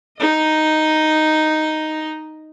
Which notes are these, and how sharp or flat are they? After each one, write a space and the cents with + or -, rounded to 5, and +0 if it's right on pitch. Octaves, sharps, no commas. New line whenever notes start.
D#4 +0 D#5 +0